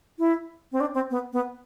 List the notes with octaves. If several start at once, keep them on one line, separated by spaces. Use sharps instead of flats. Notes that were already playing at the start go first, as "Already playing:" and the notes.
E4
C4
D4
C4
B3
B3